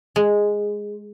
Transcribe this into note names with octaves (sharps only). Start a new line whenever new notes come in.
G#3